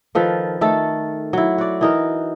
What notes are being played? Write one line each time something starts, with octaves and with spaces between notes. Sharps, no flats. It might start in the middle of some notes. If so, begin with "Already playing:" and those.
D#3 F3 A4 B4
D#3 A3 A4
F#3 E4
F#4 D5
E3 D#4 A#4